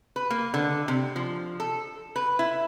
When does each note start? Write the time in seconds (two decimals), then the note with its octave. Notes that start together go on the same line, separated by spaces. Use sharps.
0.16 B4
0.30 A#3
0.54 D3
0.88 C3
1.16 F3
1.60 A4
2.16 B4
2.39 E4